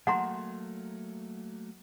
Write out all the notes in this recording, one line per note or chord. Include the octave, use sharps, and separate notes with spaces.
F#3 A3 A#3 F#5 A#5 C6